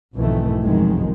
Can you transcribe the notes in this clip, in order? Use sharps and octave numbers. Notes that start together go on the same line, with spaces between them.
B1 F2 G#2 D#3 E3 A3
F1 C2 F#2 D#3 F3 G#3